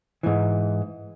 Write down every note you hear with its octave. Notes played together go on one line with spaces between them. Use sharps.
G#2 E3